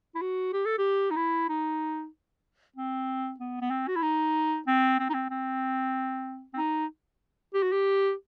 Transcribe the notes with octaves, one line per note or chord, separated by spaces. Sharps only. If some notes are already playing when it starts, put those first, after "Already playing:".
E4
F#4
G4
A4
G4
D#4
E4
D#4
C4
B3
B3
C4
F#4
E4
D#4
C4
C4
D#4
C4
C4
C4
D#4
G4
F#4
G4